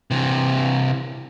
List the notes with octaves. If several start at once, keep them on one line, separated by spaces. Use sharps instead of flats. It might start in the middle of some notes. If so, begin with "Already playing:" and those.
C3 E3